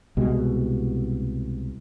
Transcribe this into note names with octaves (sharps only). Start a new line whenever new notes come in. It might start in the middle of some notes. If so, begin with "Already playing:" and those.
C2 B2 G#3